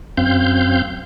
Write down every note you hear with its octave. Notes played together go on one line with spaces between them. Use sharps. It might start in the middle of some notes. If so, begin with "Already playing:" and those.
F#2 C4 F5 G6